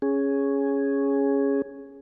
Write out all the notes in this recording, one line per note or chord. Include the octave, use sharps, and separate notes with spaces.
C#4 G#4